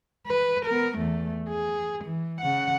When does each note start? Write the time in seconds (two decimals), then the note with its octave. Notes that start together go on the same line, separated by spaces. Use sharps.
0.27 B4
0.66 B3 A#4
0.97 E2 A3
1.49 G#4
2.05 E3
2.41 C#3 F#5